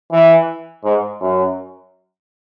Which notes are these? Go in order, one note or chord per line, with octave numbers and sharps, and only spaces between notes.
E3
G#2
F#2